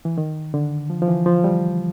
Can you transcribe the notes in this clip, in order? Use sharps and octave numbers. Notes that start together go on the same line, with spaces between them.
E3
D#3
D3
F3
F3
E3
F3
G3